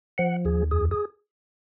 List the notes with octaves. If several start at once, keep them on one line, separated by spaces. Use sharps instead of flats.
F3 F#5
D#2 G#4
F2 G#4
G#4